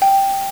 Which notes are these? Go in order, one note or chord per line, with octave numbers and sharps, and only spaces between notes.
G5